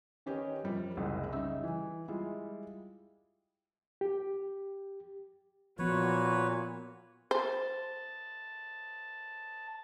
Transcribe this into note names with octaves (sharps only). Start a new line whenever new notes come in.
D#3 C#4 G4 B4 D#5
F#2 F3 G3
F#1 C2 G#3 F#5
C#3 G3 D#4 E5 E6
E3
G3 G#3 E4 F4
G4
A#2 F3 B3 F#4 B4 C#5
C5 A5